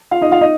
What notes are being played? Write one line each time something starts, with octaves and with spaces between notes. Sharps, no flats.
F4 F5
D#4 D#5
F4 F5
D#4 D#5